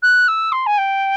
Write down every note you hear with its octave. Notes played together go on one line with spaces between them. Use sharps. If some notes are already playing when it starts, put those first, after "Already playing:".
F#6
E6
C6
G#5
G5